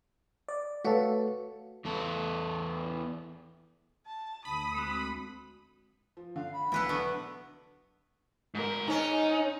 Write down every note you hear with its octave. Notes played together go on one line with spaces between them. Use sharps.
D5
A3 F#4 A4 B4 C#5 F5
E2 B3 A4
A5
D2 A5 B5 D#6
G#3 C4 F#4
F3
D3 F5
B5
B1 E3 B4 F#5 E6
D3 B3 C#6
G#2 A#4
G#2 C#4 D#4